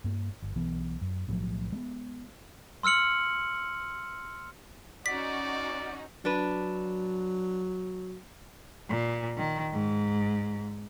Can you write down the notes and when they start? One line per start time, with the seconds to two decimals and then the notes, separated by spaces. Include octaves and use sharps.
0.04 G2 A#3
0.42 G1
0.56 B1 E3 B3
1.01 F#2
1.28 B1 A2 F3 F#3
1.72 G#3 A#3 B3
2.83 C6 E6 F6 C#7 F#7
5.06 C#4 D#4 F#4 D5 B6
6.25 F#3 D4 B4
8.90 A#2
9.37 D#3
9.72 G#2